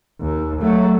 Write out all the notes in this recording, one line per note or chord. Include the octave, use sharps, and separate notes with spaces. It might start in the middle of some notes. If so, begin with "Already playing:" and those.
D#2
F#3 A3